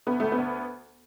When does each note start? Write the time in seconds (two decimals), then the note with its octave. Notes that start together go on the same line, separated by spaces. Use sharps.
0.07 D2 B3
0.20 D2 A3
0.32 B3
0.38 D2